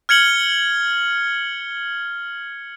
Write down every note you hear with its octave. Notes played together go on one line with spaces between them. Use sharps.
F6 G#6 C#7 F#7 G7